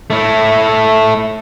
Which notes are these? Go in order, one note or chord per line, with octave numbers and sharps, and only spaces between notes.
A3 E4